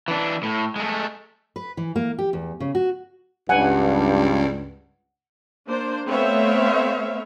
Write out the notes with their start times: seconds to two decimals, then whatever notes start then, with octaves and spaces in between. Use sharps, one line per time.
0.08 E3 D4
0.43 A2
0.76 G#3 A3
1.56 B4
1.77 E3
1.96 A#3
2.19 G4
2.33 E2
2.60 C#3
2.75 F#4
3.49 C#2 G2 F#5 G#5
5.66 A#3 D4 C5
6.06 A3 B3 C4 C#5 E5 F5